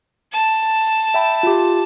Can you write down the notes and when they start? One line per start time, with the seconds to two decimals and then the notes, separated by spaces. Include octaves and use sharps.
0.33 A5
1.14 E5 G5 B5
1.43 F4 G4